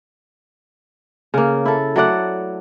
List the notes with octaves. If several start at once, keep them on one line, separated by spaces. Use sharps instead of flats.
C#3 A#3
E4 A4
F#3 A3 D5 F#5